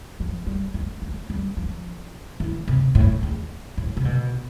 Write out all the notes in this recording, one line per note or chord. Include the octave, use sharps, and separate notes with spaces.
F3
G3
A3
A3
G3
F3
E3
C3
A2
E2
A2
C3
B2